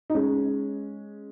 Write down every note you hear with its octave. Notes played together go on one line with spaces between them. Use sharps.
D#4
G#3 C#4